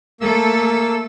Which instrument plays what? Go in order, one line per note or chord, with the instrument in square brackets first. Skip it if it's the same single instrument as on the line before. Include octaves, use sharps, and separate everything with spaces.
[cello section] A3 A4 [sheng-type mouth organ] A#3 E6